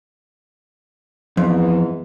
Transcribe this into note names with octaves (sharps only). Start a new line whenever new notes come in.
F2 G#2 E3 B3